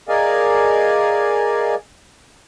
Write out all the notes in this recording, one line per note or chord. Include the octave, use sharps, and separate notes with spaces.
G#4 A#4 D5 D#5 F5 G#5